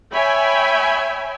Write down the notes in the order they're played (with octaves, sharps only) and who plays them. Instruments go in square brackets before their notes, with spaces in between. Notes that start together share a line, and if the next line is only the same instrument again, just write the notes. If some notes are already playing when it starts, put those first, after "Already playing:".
[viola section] C#5 E5 G5 G#5 B5